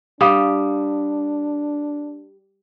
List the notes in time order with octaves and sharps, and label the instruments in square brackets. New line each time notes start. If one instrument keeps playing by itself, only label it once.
[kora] G3 [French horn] D4 [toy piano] F5 D#6